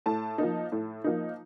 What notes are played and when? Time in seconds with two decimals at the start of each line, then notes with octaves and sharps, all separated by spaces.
0.06 A2 A5
0.38 F3 A#3 D#4
0.72 A2
1.04 F3 A#3 D#4